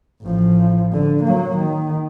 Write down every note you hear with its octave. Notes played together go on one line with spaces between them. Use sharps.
A1 F3
D3
F#3 A#3
D#3